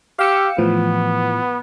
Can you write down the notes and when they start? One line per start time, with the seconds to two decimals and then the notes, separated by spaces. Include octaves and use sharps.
0.19 G4 F5 E6 C#7
0.58 A2 E3 F3 B3